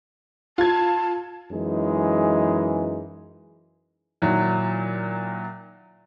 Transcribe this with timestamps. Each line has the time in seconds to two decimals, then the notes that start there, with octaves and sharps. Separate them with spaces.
0.58 F4 A5 G#6
1.52 F#2 E3 G#3 D#4
4.22 A#2 D#3 F#3 E4